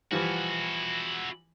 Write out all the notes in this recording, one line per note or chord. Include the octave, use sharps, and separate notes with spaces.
E3 F3 G3 E4 F#4